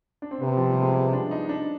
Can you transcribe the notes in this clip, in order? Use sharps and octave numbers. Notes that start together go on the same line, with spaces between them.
D4
C4
C3 B3
F3
G3
G#3
B3
D4
D#4
D4